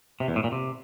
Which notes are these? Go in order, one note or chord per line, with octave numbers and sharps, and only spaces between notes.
C3
E2
A2
A#2
C3